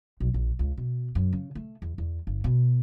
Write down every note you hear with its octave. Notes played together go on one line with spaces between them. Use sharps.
B1
A#1
C#2
B2
F#2
C#3
A3
E2
E2
G1
B2